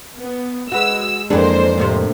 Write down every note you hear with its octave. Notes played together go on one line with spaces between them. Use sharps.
B3
G#3 F#4 B4 E6
F2 E3 G#3 A#3 D4 G#4 A4 C5
D2 A2 C3